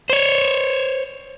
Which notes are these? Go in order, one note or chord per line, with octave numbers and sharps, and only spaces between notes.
C5 C#5